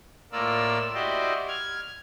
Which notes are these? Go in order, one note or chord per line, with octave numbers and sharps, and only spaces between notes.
A2 A#3 F4 D5 E6
E4 F#4 G4 C5 D5 D#5
F6 G#6